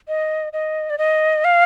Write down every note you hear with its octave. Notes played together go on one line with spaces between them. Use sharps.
D#5
D#5
D5
D#5
F5